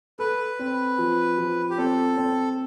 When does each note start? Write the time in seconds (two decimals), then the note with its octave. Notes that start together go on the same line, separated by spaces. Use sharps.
0.19 A4 B4
0.59 C4
0.98 F3
1.38 F3
1.70 G4
1.78 C4 A4
2.17 C4